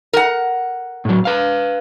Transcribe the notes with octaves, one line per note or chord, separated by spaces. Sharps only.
A#4 F#5
A2 F#3
B4 F5